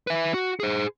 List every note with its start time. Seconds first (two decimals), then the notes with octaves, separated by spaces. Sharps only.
0.07 B4 E5
0.34 F#4
0.60 G#4 C5